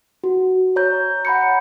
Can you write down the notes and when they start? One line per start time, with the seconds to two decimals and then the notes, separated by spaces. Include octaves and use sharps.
0.24 F#4
0.76 C#5 A#5 G6
1.25 F#5 A#5 B5 G6 C#7